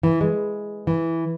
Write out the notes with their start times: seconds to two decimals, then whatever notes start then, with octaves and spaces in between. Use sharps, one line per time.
0.03 E3
0.21 G#3
0.87 E3